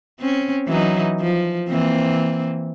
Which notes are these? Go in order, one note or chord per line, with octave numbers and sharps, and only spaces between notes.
C4 C#4
E3 F#3 D#4
F3
E3 A#3 C4